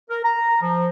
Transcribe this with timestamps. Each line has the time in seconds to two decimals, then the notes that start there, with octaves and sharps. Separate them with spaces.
0.10 A#4
0.24 A#5
0.62 F3